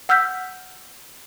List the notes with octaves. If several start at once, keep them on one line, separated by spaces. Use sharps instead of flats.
F#5 E6 F6 G6 B6